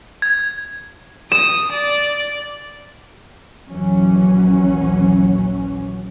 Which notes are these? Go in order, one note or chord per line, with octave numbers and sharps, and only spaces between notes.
G#6
D#6 E7
D5
A#1 D#2 E3 F#3 C#4